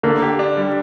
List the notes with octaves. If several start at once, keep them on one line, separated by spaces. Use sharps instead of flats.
D3 A#3
G4
D4
G3